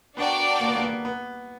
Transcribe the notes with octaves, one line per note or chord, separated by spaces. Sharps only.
B3 D4 F#4 A#4 D5 G5
A#3
B3
A#3
B3
A#3
B3